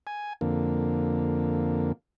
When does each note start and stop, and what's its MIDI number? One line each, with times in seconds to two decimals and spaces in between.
0.07 0.33 80
0.41 1.92 41
0.41 1.92 50
0.41 1.92 58